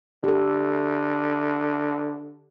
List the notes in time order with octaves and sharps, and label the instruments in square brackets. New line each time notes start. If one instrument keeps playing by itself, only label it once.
[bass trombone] D3 [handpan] G4 A4